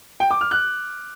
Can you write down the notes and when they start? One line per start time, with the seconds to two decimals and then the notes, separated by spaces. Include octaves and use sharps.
0.20 G5
0.30 D6
0.41 F6
0.51 F#6